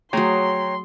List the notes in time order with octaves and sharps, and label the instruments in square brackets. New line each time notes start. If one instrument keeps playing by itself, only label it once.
[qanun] F#3 G#4 [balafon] A3 [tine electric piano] C#5 G5 A#5 [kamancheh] C6